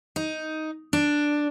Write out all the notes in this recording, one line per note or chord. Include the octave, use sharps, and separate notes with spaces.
D#4
D4